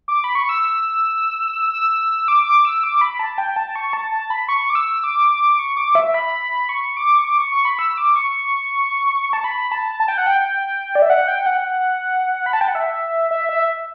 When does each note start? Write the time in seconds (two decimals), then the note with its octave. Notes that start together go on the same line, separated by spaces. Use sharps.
0.08 D6
0.24 B5
0.35 C#6
0.49 E6
1.73 E6
2.28 D6
2.46 D6
2.65 E6
2.83 D6
3.01 B5
3.19 A5
3.38 G5
3.56 A5
3.75 C#6
3.93 A5
4.12 A5
4.30 B5
4.49 C#6
4.70 D6
4.75 E6
5.04 D6
5.59 C#6
5.77 D6
5.95 E5
6.14 B5
6.69 C#6
6.97 D6
7.18 C#6
7.25 D6
7.38 C#6
7.52 C#6
7.65 B5
7.79 E6
7.97 D6
8.16 C#6
9.33 A5
9.44 B5
9.71 A5
10.00 A5
10.08 G5
10.18 F#5
10.27 G5
10.95 D5
11.02 E5
11.10 F#5
11.28 G5
11.46 F#5
12.46 B5
12.53 A5
12.61 G5
12.68 F#5
12.75 E5
13.31 E5
13.49 E5